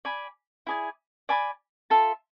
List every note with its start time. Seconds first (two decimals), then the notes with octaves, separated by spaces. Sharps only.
0.05 D5 G#5 B5
0.67 E4 G#4 D5 G#5
1.29 D5 G#5 B5 D6
1.90 F4 A4 E5 A5